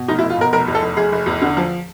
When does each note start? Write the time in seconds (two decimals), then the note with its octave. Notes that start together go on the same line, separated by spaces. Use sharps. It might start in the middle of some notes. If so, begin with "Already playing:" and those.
Already playing: B2
0.08 F1 D#4
0.19 E4
0.23 F1
0.30 F4
0.38 B2 A#4
0.53 F1 A#4
0.67 E2
0.75 A4
0.82 F1
0.97 F1 G#4
1.12 F1
1.26 E2
1.41 D3
1.57 F3